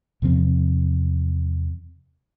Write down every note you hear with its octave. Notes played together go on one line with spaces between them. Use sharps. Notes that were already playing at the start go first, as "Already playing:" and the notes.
E2 C3 F3 C4